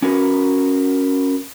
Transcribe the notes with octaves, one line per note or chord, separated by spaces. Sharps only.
C#4 F#4 A#4 B4